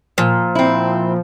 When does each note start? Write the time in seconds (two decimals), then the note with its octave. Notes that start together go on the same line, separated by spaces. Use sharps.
0.18 A#2 F3
0.55 C4 E4